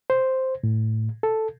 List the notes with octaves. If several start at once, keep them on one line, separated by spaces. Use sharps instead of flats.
C5
A2
A4